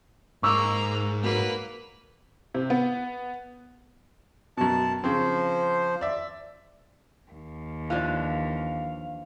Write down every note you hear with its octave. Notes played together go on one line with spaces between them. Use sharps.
G#2 A#3 A#5 C#6 D6 E6
F#3 A#3 B4
C3
B3
F#2 B2 A5
C#3 F3 C4 C5
D5 E5
D#2
E3 F3 D4 F5